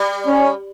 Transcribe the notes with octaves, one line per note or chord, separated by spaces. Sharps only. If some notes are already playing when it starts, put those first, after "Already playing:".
Already playing: G3
C#4